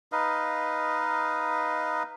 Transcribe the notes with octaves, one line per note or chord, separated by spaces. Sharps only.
D#4 B4 D#5 F5